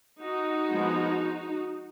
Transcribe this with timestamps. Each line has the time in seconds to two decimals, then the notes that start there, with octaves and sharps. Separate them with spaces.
0.21 D#4 F#4
0.71 F3 G#3 B3